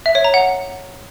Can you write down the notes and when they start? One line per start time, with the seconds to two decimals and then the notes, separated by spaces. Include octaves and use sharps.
0.06 E5
0.15 C#5
0.24 A#5
0.34 F#5